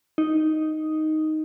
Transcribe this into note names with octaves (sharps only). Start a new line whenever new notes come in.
D#4